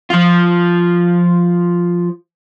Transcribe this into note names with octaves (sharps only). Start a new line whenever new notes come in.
F3 F4